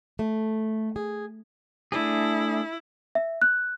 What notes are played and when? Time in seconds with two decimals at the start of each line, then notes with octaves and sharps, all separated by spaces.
0.19 A3
0.96 G#4
1.92 A3 D4 E4 G#4
3.15 E5
3.42 F#6